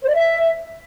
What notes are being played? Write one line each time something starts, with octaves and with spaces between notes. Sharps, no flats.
C5
D5
E5